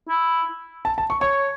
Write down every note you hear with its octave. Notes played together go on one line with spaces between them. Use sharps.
E4
A5
A5
C#6
C#5 C#6